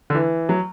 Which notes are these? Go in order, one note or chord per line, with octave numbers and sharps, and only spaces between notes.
D3
E3
F#3